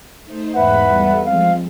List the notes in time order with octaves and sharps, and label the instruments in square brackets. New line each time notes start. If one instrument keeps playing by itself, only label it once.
[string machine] A3 D#4 C5
[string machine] E2 G#2 B5 [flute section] B4 E5 F#5
[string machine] E2 G3 A4
[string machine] F3 G#3 C4 [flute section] F5